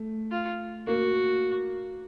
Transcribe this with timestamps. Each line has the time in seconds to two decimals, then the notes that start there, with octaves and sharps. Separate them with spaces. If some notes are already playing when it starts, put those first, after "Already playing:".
Already playing: A3
0.31 F4
0.87 A#3 F#4